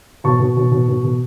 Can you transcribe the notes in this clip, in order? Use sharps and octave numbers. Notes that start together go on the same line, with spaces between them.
B2 A5 C#6
B2
B2
B2
B2
B2